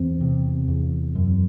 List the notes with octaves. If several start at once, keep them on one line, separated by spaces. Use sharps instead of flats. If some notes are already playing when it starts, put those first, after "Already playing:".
Already playing: E2 C4
C3
E2
F#2